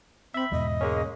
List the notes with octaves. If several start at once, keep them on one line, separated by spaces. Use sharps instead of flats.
C4 E5 B5
E2 G#2 B2 D#5
G#3 A#3 C#4